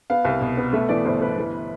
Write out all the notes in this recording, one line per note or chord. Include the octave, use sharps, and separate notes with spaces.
B3 F5
C2
B2
B3
A3 E5
E3 D5
G1 C5
G1 B4
E3